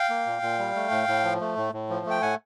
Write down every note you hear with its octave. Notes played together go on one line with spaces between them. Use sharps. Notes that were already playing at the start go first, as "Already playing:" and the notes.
Already playing: F5 G5
A#3
A#2
A#2
G3
A3
A2
A2
F3
A3
A2
A2
F3
A3 G5
A2 F#5 G#5